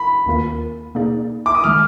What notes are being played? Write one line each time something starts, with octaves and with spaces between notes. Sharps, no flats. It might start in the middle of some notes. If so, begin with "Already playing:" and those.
Already playing: B5
D#2 D#3 A#3 F4 A#4
B2 A#3 D#4 G#4 D5
D6
D#6
D#3 G#3 F6